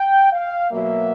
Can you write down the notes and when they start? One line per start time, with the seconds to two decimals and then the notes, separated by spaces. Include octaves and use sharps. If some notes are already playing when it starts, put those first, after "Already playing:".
Already playing: G5
0.33 F5
0.71 B2 F#3 A#3 E5